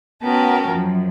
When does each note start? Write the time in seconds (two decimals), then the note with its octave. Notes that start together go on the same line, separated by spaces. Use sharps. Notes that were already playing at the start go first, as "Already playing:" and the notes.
0.23 B3 C#4 F#4 A#4 G5 A5
0.67 F#2 F3